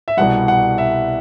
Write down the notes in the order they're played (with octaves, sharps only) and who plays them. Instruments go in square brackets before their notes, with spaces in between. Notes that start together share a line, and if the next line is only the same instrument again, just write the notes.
[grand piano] E5
C2 B2 G3 F#5
F#5
E5